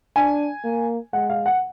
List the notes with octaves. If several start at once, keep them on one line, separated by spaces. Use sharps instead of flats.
D4 G#5
A#3
G#3 F#5
F5
F#5